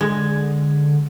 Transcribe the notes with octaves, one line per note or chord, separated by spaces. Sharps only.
D3 G#3